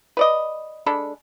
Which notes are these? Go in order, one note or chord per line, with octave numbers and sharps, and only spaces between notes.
B4 D5 D#5
G#3 D4 A4 B5